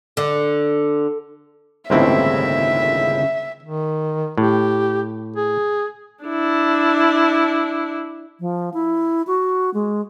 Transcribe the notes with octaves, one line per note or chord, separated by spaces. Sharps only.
D3
G1 D#2 A2 C#3 G#3 C4 E4 E5
D#3
A2 G4
G#4
D4 E4
F3
E4
F#4
G#3